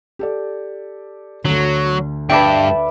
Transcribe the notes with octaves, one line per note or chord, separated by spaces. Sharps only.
G4 A4 D5
D2 D3 F#3
G2 B4 D5 E5 G5 A5